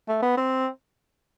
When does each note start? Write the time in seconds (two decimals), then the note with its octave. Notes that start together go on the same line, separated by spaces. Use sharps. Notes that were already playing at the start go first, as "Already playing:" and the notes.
0.08 A3
0.22 B3
0.37 C4